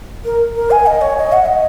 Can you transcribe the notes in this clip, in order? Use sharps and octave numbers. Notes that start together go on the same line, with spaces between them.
A#4
A#4
G#5
D#5
C#5
D#5
F#5
D#5